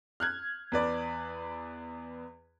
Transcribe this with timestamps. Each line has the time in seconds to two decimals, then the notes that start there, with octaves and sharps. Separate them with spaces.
0.20 F6 F#6 G#6
0.72 E2 B4 D5